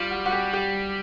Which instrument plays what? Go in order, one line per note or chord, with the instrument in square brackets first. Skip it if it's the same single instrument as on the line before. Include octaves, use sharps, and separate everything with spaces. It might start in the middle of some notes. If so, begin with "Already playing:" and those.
Already playing: [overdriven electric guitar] G3 [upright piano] F4
[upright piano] F#4
F#4
G4
G4